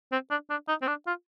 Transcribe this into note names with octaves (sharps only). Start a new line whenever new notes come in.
C4
D4
D4
D#4
C4
D4
F4